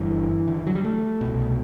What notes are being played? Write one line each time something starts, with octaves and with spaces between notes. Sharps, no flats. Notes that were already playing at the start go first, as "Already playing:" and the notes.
Already playing: G1 G2 D3 E3
D3
E3
F#3
G3
A3
C2 B2